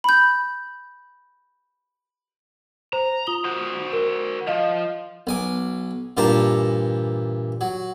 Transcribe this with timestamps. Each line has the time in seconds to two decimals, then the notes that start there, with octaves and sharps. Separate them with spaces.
0.04 B5 G6
2.93 C5 A#5
3.27 F4 D#6 G7
3.45 F#4 C5
3.93 A#4
4.47 F3 D#5 F5
5.27 B1 G#5 D6
6.17 G2 A#2 E3 G4 A5 A#5
7.61 F#3